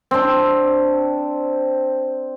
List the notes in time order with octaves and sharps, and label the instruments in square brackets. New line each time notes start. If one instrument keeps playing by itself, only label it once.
[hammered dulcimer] C4 D4